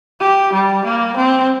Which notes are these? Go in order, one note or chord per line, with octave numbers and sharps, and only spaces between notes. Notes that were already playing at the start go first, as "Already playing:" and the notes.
G4
G3
A#3
C4